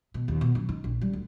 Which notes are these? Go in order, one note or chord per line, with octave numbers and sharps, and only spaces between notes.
B2
D#2
B2
F#2
D#4
A#1
G3
D2